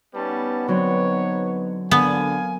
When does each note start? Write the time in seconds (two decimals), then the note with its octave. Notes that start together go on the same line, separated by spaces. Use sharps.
0.15 G3 B3 C#4 D#4 B4 A5
0.68 D3 F#3 C4 C#5
1.91 D3 B3 A#4 F5 G#5